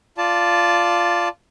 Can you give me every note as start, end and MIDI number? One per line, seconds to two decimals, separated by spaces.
0.18 1.29 65
0.18 1.29 74
0.18 1.29 81